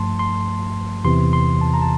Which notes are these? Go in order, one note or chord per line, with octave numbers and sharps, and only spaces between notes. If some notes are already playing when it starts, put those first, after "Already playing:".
Already playing: G2 F3 A3 A5 C6
C6
E2 C3 E3 C6
C6
A5
A#5
A5